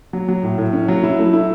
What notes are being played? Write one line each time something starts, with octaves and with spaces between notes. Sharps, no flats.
F#3
F#3
A2
A2
C#4
F#3
E4
A3
E4